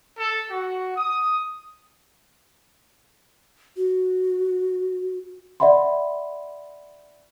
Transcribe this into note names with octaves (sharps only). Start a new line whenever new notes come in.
A4
F#4
D#6
F#4
D5 E5 F#5 B5 C6